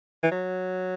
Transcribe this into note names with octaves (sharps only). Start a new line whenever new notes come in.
E3
F#3